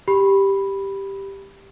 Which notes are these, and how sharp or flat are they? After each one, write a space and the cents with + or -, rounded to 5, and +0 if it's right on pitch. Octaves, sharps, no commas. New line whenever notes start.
G4 +0 B5 +0